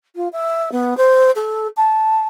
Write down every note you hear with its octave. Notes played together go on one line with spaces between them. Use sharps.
F4
E5
B3
C5
A4
A5